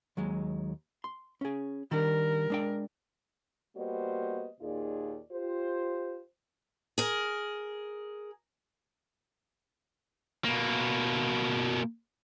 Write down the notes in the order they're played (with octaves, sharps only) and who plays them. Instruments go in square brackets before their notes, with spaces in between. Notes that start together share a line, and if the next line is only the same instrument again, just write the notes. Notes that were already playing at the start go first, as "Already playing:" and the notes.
[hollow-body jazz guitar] D#2 F#3 G#3
C6
C#4 G#4
[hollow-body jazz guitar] D#3 G3 D4 [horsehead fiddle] A#4
[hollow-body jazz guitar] G#3 D4 G5
[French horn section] G3 A#3 B3 F#4 C5 D#5
D#2 A#2 D#4 F4 G#4 D5
F4 G4 C5
[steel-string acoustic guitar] G#4 A#4
[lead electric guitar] B2 A#3